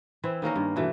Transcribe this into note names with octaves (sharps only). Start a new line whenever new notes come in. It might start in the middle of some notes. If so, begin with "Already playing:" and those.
E3 C4 E4
D#3 A#3 C#4 A#4
G2
B2 E3 A3